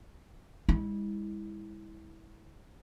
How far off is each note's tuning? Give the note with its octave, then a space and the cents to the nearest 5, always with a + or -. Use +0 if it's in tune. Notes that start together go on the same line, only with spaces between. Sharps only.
G#3 -40 E4 -25